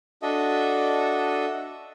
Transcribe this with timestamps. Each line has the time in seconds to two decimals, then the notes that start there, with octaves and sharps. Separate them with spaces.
0.22 D4 F#4 A4 D#5 E5